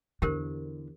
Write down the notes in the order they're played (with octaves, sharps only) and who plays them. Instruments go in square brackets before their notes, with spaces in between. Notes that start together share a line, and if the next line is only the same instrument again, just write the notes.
[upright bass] E2 D3 [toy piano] G4 A#4 C5